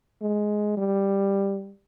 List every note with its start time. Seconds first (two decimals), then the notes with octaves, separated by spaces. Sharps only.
0.21 G#3
0.77 G3